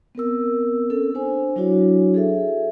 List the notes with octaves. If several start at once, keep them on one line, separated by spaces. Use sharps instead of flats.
B3 C4 A#4 E6
C4 C#4 A4
D4 C5 G#5
F#3 D4 E4 F#4 C#5
G#4 A4 E5